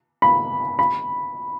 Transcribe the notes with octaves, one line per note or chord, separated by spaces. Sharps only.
B5
B5